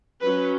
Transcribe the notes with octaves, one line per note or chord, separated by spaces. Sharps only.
F#3 C#4 B4